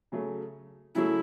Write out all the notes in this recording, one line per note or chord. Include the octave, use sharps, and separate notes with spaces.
C#3 F#3 A3
C#3 F#3 A3 E4